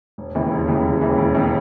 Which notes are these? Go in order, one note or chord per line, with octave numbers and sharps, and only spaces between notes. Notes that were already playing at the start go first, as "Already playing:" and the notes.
E1
D#2 C#3 E3
E1
D#2 C#3 E3
E1
D#2 C#3 E3
E1
D#2 C#3 E3